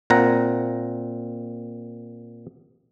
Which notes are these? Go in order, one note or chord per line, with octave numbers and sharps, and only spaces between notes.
A#2 C4 F#5 A#5